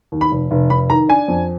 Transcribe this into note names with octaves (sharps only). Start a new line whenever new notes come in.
D#2
B5
F1
F1
F1 B5
D#3 A#5
D4 G#5
F2